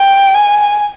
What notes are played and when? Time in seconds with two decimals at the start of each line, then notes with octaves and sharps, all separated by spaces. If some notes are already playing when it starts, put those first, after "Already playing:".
Already playing: G5
0.35 G#5